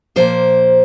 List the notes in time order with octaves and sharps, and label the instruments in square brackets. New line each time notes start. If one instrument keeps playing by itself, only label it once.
[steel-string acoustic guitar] A#2 F3 A#3 C5